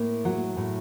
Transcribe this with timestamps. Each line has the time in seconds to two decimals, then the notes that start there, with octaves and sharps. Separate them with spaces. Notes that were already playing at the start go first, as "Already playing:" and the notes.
Already playing: A2 A#3
0.25 F#3
0.57 A2